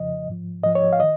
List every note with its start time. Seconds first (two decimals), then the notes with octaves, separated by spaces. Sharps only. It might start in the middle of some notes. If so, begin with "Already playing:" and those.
Already playing: F2 C#3 F3 D#5
0.27 G#2 F3
0.63 G#2 F3 D#5
0.75 C#5
0.93 F5
1.00 D#3 D#5